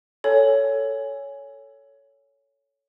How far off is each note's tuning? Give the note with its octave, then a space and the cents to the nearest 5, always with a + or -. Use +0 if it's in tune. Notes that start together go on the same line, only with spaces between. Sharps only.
A4 +0 C#5 +10 G#5 +0